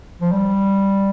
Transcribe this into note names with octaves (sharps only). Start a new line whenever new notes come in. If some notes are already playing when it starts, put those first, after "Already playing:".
F3
G3